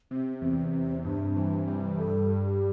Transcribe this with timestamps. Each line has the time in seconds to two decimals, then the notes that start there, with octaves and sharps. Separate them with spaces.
0.11 C3 C4
0.41 E2 C4
0.73 C3 C4
1.04 G2 D4
1.36 E3
1.67 G3
1.98 G2 A4
2.29 G2
2.45 G4